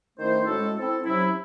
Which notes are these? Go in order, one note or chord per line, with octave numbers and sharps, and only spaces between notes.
D#3 A3 C#4 E4 C5
A2 G#3 C#4 F#4 A4
C4 E4 A4
C3 F#3 C#4 E4